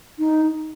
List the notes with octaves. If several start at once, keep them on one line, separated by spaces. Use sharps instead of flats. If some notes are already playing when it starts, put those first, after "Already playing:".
D#4